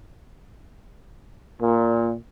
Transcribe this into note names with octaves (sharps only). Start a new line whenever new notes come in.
A#2